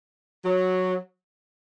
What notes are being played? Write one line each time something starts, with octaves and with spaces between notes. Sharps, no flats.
F#3